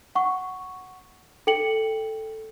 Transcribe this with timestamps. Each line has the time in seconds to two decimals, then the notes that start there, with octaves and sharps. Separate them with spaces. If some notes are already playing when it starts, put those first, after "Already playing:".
0.15 F#5 C#6
1.47 A4 G5 C#7 F#7